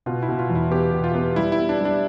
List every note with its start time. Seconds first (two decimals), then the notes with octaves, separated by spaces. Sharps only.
0.06 B2 F4
0.22 E4
0.29 B2
0.39 F4
0.50 E2
0.55 E4
0.71 B3 G4
0.93 B2
1.04 F4
1.15 B3
1.36 G3 E4
1.52 E4
1.59 B3
1.69 D4
1.80 G3 D4